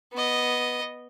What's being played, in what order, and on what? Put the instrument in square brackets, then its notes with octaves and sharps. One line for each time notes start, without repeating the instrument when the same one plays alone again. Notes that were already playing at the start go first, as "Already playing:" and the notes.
[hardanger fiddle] B3 D#5